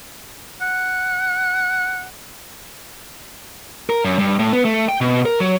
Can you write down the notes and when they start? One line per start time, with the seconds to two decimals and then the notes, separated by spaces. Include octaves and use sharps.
0.62 F#5
3.90 A#4
4.05 F#2
4.19 G2
4.39 A2
4.53 B3
4.65 A3
4.89 G5
5.01 B2
5.25 A#4
5.40 F#3